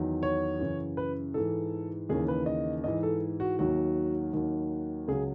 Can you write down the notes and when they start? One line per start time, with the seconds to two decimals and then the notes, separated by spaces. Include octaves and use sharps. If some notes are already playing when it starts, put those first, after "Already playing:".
Already playing: E2 D#3 F#3
0.23 C#5
0.60 F#2 C#3 E3
0.97 B4
1.34 G#2 E3 A4
2.09 D#2 C#3 E3 G#4
2.28 B4
2.46 D#5
2.84 G#2 E3 D#5
3.03 A4
3.40 F#4
3.59 D#2 D#3 F#3 F#4
4.33 D#2 D#3 F#3
5.08 C#2 C#3 F#3 G#4